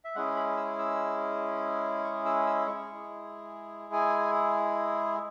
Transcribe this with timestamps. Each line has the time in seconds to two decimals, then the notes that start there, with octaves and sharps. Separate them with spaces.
0.04 E5
0.15 G#3 C#4 E4 G#4 F#5
0.36 B5
0.57 E6
0.79 E6
2.04 C#6
2.25 E6
2.47 E6
2.67 G#3 E4 G#4 C#6
3.93 G#5